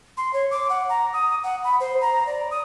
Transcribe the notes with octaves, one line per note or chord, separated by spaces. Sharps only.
C6
C#5
D6
F#5
A#5
D#6
F#5
B5
C5
A#5
D5
D#6